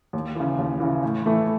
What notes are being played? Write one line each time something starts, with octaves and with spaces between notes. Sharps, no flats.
D#2
C#3 E3
D#2
C#3 E3
A2
E3 A3 E4